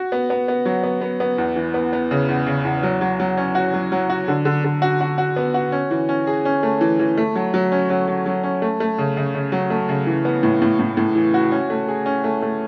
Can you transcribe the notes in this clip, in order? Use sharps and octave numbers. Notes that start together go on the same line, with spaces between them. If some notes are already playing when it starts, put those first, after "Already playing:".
Already playing: F#4
B3
B3
B3
F#3
B3
B3
B3
E2
E3
B3
B3
C#3
E2
C#3
E2
F#3
F#3
F#3
C#4
F#4
F#3
F#3
F#4
D3
D3
D3
F#4
F#4
F#4
B3
F#4
C#4
E3
C#4
G#4
C#4
A3
E3
E3
A3
F#3
F#3
C#4
F#3
F#3
F#3
C#4
A3
A3
C#3
C#3
C#3
F#3
A3
C#3
E3
B3
A2
A2
A2
A2
E3
F#4
C#4
A3
G#4
C#4
A3
A3